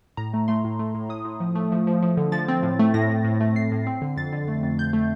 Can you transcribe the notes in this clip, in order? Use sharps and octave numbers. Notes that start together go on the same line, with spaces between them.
A2 A#5
A3
A3 C6
A2
A3
A2
A2 D#6
A2
F3
A3
F3
F3
F3
D3
F3 A6
C4
A2
A3
A2 A#6
A2
A2
A3
A2 C7
A2
C4
D3
F2 A6
D3
A3
F2
F2 G6
A3